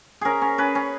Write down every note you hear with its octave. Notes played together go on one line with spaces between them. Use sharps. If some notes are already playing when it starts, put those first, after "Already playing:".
C#4 G#4 A#4
C#4
C#4 B4
C#4